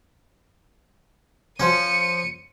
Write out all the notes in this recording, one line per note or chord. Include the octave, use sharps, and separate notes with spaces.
F3 C#4 C#7 D#7